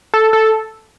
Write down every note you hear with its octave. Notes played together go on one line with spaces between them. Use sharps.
A4
A4